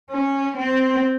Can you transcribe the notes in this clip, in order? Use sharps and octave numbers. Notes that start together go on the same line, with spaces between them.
C#4
C4